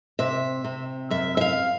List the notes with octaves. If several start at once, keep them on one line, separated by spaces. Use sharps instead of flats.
C3 E5
C3
F#2 E5
E5
F5